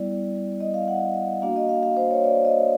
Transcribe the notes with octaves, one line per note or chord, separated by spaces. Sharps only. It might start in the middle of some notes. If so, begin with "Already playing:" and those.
Already playing: G3 B3 E4 D5
D#5
F5
F#5
A#3 D4 F#4 F5
D#5
F5
F5
C5
C#5
D5
D#5